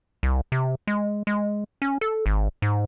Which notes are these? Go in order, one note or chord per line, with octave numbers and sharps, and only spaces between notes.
C2
C3
G#3
G#3
C#4
A4
G#1
G#2